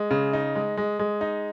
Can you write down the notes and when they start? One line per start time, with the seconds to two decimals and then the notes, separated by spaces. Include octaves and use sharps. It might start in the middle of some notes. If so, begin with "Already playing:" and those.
Already playing: G#3
0.11 C#3
0.33 D#4
0.56 G#3
0.77 G#3
0.99 G#3
1.21 D#4